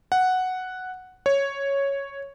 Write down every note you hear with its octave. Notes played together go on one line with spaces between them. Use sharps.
F#5
C#5